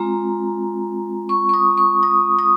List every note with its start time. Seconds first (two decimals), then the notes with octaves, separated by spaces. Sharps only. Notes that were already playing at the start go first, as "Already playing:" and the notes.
Already playing: G#3 C4 F4 A#5
1.29 C#6
1.49 C#6
1.54 D#6
1.78 C#6
2.03 D#6
2.39 D#6